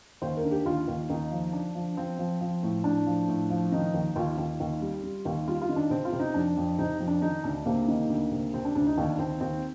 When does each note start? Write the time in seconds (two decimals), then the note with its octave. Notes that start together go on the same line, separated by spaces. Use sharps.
0.22 D#2 C5
0.37 A#4
0.44 D3
0.51 G4
0.65 D#2 F4
0.88 D#2
1.10 D#2 D#4
1.31 F3
1.53 D3 D4
1.75 F3
1.97 F3 C4
2.19 F3
2.41 F3
2.63 A2
2.84 A2 D4
3.07 F3
3.28 A2
3.50 F3
3.72 D#3 D#4
3.94 D#2
4.16 D#2 F4
4.38 D#2
4.60 D#2
4.81 G3
5.03 G3
5.25 D#2
5.47 G3 F4
5.62 F4
5.69 D#3
5.76 D4
5.90 C3 C4
6.05 F4
6.13 C3
6.20 D#4
6.34 F2 D4
6.57 F2
6.78 C3 D#4
7.00 F2
7.08 D4
7.22 D#3 D#4
7.44 D2 D4
7.65 C3 A#3
7.88 D#3
8.09 D2
8.31 C3
8.54 C3 C4
8.65 D4
8.75 D2 D4
8.87 D#4
8.97 D#2 D4
9.19 D#2 C4
9.41 D#2 C4